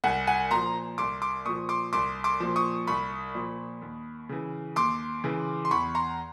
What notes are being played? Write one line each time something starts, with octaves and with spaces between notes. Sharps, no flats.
C2 F#5 G#5
F#5 G#5
A#2 F3 A#5 C6
C2 C6 D6
C6 D6
A#2 F3 C#6 D#6
C6 D6
C2 C6 D6
C6 D6
A#2 F3
C#6 D#6
C2 B5 C#6
A#2 F3
D#2
C#3 E3
D#2 C6 D6
C#3 E3
C6
E2 B5 C#6
A#5 C6